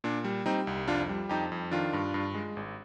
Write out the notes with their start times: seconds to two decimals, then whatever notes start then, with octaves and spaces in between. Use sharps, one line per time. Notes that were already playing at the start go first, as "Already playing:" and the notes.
0.04 A#2 D4
0.24 G3
0.46 G3 C4 D#4
0.67 C2
0.87 F2 D4 F4
1.09 G3
1.29 F2 D#4 G4
1.52 F2
1.71 D#3 D4 F4
1.93 G2
2.14 G2
2.34 G#3
2.57 G#1